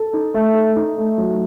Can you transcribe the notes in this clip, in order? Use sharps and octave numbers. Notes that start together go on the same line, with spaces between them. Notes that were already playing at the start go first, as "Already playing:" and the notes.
Already playing: A4
D#4
A3
A4
D#4
A3
F#3